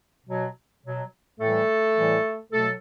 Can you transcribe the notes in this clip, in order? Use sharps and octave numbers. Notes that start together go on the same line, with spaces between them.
B2 F#3
B2 F#3
A2 E3 G3 A3 A4
A2 E3 G3
B2 F#3 A3 A4